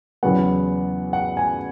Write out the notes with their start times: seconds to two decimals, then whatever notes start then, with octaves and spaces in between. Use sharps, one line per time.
0.23 E2 C#3 F#3 B3 F#5
1.13 F#5
1.37 G#5